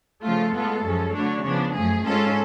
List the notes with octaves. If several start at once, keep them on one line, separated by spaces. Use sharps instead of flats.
C#3 F3 A3 F4 A4
A2 G#3 B3 F4
F#2 F3 G#3 C#4
D3 F#3 A3 D4 C#5
C#3 F3 B3 D4
F#2 F3 A3 G#4
G#2 G#3 C#4 F4 A4